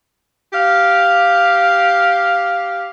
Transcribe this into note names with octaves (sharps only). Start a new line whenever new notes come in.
G4 F5